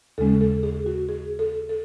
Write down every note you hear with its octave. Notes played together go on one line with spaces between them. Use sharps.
D#2 C#3 G#3 C#4 A4
A4
G#4
F#4
G#4
A4
A4